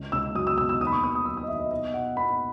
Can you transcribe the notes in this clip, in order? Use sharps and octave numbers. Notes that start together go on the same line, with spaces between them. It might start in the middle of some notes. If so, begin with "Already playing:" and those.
Already playing: C#2
C#2 E6
F#3 D#6
E6
B2 E6
E6
D#2 D#6
B5
C#6
B3 D#6
D#6
F#3 E6
D#6
D#5
D#3 E5
D#5
B2 D#5
B2 F#5
B3 B5